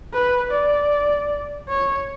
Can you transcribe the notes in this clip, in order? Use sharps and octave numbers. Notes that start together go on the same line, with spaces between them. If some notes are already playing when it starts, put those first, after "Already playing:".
B4
D5
C#5